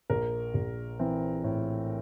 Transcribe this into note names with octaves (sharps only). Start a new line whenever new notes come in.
A#1 A#4
A#1
E3 C4
A2